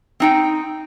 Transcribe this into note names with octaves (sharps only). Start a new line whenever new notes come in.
C4 D#4 G5